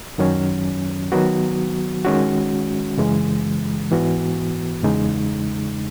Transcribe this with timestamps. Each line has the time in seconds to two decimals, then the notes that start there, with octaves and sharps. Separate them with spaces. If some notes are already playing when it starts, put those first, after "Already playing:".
0.18 F#2 D#3 F#3 C#4
1.12 D#3 F#3 B3 F#4
2.05 D#3 G#3 C#4 F#4
2.97 F#2 C#3 E3 G#3
3.91 G#2 E3 B3 F#4
4.83 E2 C#3 G#3 D#4